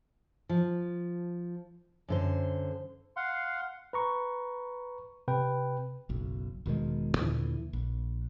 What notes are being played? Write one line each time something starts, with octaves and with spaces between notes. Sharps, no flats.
F3
F#2 D3 C5
F5 F#5 C6
B4 A#5 C#6
C3 B4 G5
F#1 B1
E1 B2 D#3 G#3
D#2 A#2 D3 E3
A#1